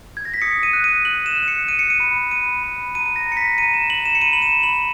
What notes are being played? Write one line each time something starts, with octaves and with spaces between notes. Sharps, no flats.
G#6
A#6
B6
D#6 C#7
D#7
F#6
D#7
F#6 F#7
E7
F#6
C#7
F#6 D#7
C#7
D#7
B5
B5 D#7
B5
A#5 D#7
A#6
A#5
C#7
B6
A#5 D#7
E7
A#5 F#7
E7
C#7
B5 D#7
F#7
E7
B5
F#7